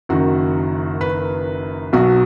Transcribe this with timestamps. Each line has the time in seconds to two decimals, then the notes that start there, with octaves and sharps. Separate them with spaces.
0.09 F#1 F#2 D#3 F#4
1.01 B4
1.93 B1 B2 F#3 F#4